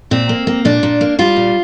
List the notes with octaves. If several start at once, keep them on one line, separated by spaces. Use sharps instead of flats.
A#2 C4
A#3
A#3
A#2 D4
A#2
A#3
G3 F4
A#2